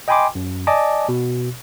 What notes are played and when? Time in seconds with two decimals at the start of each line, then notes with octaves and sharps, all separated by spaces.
0.08 D#5 G5 G#5 B5 C6 D6
0.35 F#2
0.67 D5 D#5 G#5 A5 D6
1.09 B2